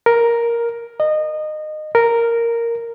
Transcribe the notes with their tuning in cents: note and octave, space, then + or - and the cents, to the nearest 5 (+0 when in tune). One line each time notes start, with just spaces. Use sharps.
A#4 +5
D#5 -20
A#4 -5